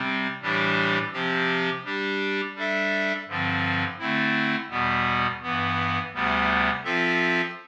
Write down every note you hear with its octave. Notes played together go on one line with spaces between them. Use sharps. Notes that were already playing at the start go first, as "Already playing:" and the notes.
Already playing: C3 G3 C4
A2 E3 G3 D4 G4
C3 F3 C4 G4
G3 D4 G4
G3 D4 A4 E5
G2 D3 F3 C4
D3 A3 C4 E4
E2 B2 G3 B3
G2 E3 B3
D2 C3 G3 B3
F3 C4 F4 A4 E5